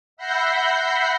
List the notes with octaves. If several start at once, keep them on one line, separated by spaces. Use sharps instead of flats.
E5 F#5 B5 G6 A#6 C7